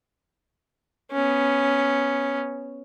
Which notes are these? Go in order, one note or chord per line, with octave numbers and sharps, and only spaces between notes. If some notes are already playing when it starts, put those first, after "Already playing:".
B3 C#4